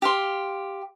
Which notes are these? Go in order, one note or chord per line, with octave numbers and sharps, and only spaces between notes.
G4 F5 C6